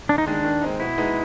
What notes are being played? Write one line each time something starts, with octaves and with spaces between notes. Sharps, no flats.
D#2 D4
D#4
D#3 G#3 D4
D#3
G#3 C4 D#4
B2 E4
G#3 B3 D#4